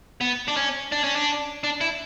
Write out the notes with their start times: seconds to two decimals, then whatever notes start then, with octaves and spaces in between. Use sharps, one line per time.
0.21 B3
0.48 D4
0.57 C#4
0.92 D4
1.04 C#4
1.16 D4
1.64 D4
1.81 E4